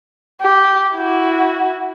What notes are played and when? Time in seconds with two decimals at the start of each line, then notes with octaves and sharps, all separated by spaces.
0.41 G4
0.96 E4 F#4